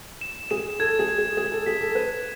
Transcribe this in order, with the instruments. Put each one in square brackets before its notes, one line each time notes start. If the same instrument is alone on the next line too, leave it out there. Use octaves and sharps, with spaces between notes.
[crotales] E7
[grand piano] G#4 [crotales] E7
[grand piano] A4 [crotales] G#6
[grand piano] G#4
[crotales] G#6
[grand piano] G#4
[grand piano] G#4 [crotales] G#6
[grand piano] A4
[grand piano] G#4 [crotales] B6
[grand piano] A4
[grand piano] B4 [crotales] E7